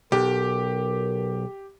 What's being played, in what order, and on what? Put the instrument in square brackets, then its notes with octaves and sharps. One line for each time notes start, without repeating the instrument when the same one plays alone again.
[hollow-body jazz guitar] B1 [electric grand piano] G4 [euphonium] A#4